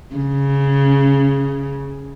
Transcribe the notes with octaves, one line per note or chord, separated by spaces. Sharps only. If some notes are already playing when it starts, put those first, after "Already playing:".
C#3